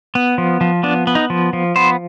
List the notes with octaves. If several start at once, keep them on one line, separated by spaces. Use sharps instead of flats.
B3
F3
F3
B3 D4
B3
D#4
F3
F3
B3 C5